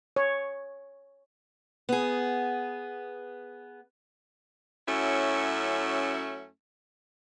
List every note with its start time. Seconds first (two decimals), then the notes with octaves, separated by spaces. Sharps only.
0.16 C#5
1.89 B3 G#4
4.87 F#2 F#3 A3 C#4 E4